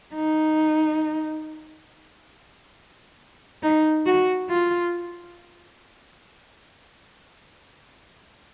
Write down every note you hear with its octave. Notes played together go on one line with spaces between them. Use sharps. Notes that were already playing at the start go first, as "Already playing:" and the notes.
D#4
D#4
F#4
F4